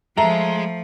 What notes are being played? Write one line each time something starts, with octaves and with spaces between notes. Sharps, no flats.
F3 G#3 A3 A#5